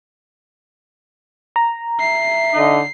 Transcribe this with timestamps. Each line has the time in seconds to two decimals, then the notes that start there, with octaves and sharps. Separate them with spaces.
1.56 A#5
2.00 E5 C7
2.54 D3 D#4 D#5